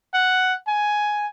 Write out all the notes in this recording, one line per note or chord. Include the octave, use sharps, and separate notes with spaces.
F#5
G#5